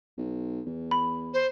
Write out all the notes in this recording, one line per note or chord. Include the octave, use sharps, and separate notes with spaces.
B1
E2
B5
C5